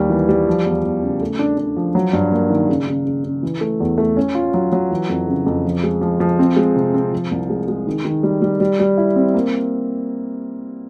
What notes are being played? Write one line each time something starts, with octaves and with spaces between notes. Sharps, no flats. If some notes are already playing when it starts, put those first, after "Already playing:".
Already playing: D#2 G3
E3
G3
F3
E2
E2
C#3
A3
D4
D4
F3
F#3
G2
A#3
D#3
C#3
C#3
C#3
C#3
E3
A3
E2
A3
C#4
F4
F#3
F#3
E3
F2
C#3
F2
F3
G#3
F3
F3
C4
G#3
C3
C4
F3
C2
G#3
G#3
D#3
D#3
G3
G3
G3
G3
E4
C4
A#3